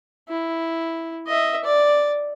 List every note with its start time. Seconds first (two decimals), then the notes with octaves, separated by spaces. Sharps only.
0.29 E4
1.27 D#5 E5
1.64 D5